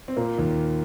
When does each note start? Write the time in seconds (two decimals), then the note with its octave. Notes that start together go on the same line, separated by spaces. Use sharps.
0.08 C4
0.17 A#2 A#3
0.38 D#2 D#3